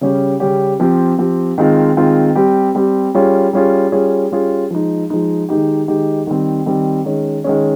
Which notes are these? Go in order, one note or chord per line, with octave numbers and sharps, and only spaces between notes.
C#3 G3 C#4 G4
C#3 G3 C#4 G4
F3 C4 G4
F3 C4 G4
D#3 G#3 C4 F4
D#3 G#3 C4 F4
G3 C4 G4
G3 C4 G4
G3 C#4 F4 G#4
G3 C#4 F4 G#4
G3 C#4 F4 G#4
G3 C#4 F4 G#4
F3 G#3 D#4
F3 G#3 D#4
D#3 G#3 D#4 G4
D#3 G#3 D#4 G4
D#3 G3 C4
D#3 G3 C4
D#3 G#3 C#4
D#3 G#3 C#4